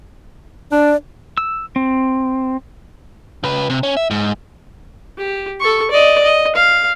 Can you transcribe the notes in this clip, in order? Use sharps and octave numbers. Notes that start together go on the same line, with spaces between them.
D4 D5
E6
C4
C#3 B4
C3
C#4
E5
G#2
G4
A4 C#6
D5 D#5
D#5
F5